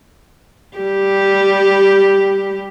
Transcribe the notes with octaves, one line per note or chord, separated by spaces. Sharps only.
G3 G4